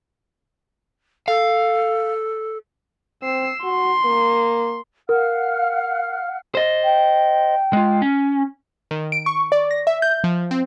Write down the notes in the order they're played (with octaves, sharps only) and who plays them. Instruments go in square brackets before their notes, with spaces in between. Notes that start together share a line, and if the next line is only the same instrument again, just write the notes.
[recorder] A4 [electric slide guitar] F5
[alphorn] C4 [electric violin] E6 C7
[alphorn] F#4 [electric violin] C6
[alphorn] A#3
[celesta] A#4 [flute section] F5 F#5 F6
[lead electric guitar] C5 D#5
[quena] G5
[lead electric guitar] G#3 F4
C#4
[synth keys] D#3
D7
C#6
D5
A#6
E5
G6
F3
C4